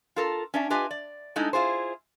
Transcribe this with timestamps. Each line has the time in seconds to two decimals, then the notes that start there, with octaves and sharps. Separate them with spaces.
0.16 F4 A4 A#4
0.54 C#4 D4 E5
0.70 F4 G4 B4 D#5 G#5
0.91 D5
1.36 G#3 A3 D#4 E4
1.53 E4 F4 G#4 C5